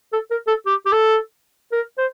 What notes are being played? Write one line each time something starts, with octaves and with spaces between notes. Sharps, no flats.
A4
A#4
A4
G4
G4
A4
A#4
C5